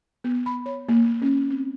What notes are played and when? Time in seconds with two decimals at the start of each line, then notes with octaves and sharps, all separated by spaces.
0.24 B3
0.46 B5
0.66 C#5
0.89 A#3
1.22 C#4
1.50 C4